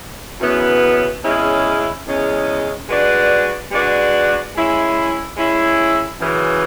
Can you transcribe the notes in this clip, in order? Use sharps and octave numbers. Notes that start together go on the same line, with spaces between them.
F#2 C#3 E3 B3
E2 C#3 G#3 C#4 E4
E2 C#3 G#3 C#4 E4
G#3 D4 F#4 B4 D5
G#3 D4 F#4 B4 D5
G#3 C#4 E4
G#3 C#4 E4
F#2 C#3 E3